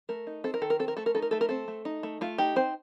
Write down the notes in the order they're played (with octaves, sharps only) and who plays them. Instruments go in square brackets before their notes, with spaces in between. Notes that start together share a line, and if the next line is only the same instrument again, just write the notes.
[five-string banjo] A3 A#4
D#4
C4 A4
A#4
D#3 A4
A#4
C4 A4
A#4
A3 A4
A#4
D#4 A4
A#4
A3 A4
A#4
C4 A4
A3
D#4
A3
A3 F4
D#4 G4
C4 C5